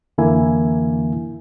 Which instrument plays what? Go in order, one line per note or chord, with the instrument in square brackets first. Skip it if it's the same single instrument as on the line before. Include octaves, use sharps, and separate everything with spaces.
[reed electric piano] F2 D3 E3 A#3 E4 G#5